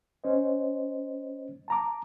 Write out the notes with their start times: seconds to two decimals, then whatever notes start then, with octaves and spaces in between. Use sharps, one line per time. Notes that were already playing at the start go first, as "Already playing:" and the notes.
0.24 C#4 C5 C#5 D#5
1.68 A5 A#5 D6